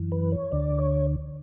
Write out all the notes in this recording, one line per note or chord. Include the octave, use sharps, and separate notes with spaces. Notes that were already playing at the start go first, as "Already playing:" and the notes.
Already playing: F#2 E3
B4
C#5
D2 D3 D5
C#5